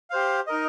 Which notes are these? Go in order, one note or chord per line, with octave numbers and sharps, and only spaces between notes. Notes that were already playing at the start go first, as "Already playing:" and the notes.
G4 C5 F5
D#4 A#4 D#5